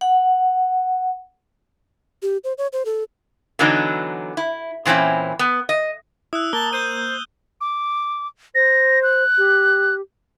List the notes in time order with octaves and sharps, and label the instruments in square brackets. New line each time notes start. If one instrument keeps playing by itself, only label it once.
[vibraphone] F#5
[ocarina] G4
C5
C#5
C5
A4
[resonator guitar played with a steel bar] D3 E3 F#3 B3 D4 D#4
E4
A#2 E3 C4 C#4 E4
B3
D#5
[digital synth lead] E4 [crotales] D#6 E6 F#6
[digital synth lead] A#3 [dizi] A5 [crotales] G7
[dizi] C5 [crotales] G6 D#7
[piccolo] D6
[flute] C5 [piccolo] A#6
[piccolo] F#6
[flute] G4